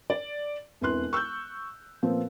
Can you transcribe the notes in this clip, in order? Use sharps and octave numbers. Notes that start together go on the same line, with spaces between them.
D5
E1 F2 E4 B4 C6 F#6
C#6 E6 F#6 G6
A#2 F3 B3 C4